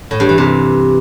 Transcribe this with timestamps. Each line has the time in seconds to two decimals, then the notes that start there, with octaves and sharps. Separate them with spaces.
0.11 A2
0.20 G2
0.29 E3
0.38 C3